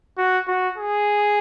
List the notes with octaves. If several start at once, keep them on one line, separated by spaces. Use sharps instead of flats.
F#4
F#4
G#4